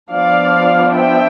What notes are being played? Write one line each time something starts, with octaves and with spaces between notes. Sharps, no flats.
F3 B3 D4 D5 F5
E5 G5